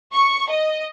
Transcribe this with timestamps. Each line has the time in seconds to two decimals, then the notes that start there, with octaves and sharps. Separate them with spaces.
0.13 C#6
0.50 D#5